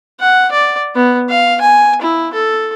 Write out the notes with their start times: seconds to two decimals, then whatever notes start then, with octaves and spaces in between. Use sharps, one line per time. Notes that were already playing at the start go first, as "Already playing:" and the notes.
0.20 F#5
0.51 D5
0.95 B3
1.29 F5
1.61 G#5
2.02 E4
2.33 A4